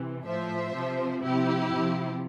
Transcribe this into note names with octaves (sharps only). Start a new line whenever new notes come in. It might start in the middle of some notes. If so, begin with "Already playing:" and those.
Already playing: C3 E3
A2 F3 C5 E5
C3 F3
C3 F3 E4 G4
C3 F3